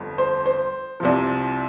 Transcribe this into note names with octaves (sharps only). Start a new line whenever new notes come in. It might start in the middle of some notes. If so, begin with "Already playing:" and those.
Already playing: G1 F2
C5
C5
C2 C3 F3